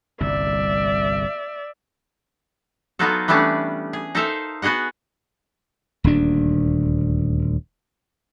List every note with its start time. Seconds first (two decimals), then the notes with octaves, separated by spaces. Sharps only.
0.20 G1 C2 D5 E5
2.99 F#3 B3 D#4 F4 F#4 A4
3.28 E3 G3 A3 B3 C#4 D4
3.93 G#4
4.15 D#4 A4 A#4 C5 E5 F5
4.62 B3 F#4 G#4 D#5 F#5
6.04 D#1 D2 D4